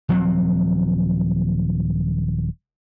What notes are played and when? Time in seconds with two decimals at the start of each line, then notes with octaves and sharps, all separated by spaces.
0.09 D#1 F3 F#3 C4